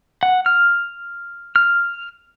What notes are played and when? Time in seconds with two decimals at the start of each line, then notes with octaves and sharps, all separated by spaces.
0.23 F#5
0.46 F6
1.56 F6